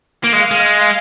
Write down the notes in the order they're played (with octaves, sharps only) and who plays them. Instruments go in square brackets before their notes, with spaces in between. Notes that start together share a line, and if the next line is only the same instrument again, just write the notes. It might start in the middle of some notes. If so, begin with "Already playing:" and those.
[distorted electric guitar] A#3 [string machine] F5
[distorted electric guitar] G#3
G#3